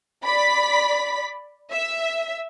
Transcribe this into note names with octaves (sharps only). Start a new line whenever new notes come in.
D5 B5 B6
E5